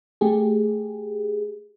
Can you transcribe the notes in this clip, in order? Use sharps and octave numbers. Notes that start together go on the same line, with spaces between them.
A3 G4 G#4